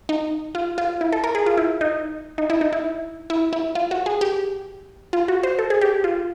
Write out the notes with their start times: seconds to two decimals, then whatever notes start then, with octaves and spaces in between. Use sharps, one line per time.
0.09 D#4
0.55 F4
0.78 F4
1.01 E4
1.12 A4
1.24 A#4
1.35 G#4
1.46 F4
1.57 E4
1.81 D#4
2.38 D#4
2.50 E4
2.61 D#4
2.73 E4
3.30 E4
3.53 E4
3.75 F4
3.91 F#4
4.06 G#4
4.21 G4
5.13 F4
5.28 F#4
5.43 C5
5.59 A4
5.70 G#4
5.81 G4
6.04 F4